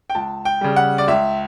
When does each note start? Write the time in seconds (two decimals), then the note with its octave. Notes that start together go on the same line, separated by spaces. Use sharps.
0.10 G5
0.15 C#2 A5
0.45 G5
0.61 C#3 G3
0.76 F#5
0.98 D5
1.08 C#2 E5